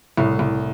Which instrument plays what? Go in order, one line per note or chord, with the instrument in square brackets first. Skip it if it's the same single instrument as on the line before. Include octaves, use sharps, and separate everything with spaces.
[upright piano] C2 [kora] A2
[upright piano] C2